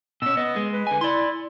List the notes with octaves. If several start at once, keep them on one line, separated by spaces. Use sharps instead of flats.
B2 C#4 E6
B3 D#5
G#3
B4
D3 G#5
E4 D5 C6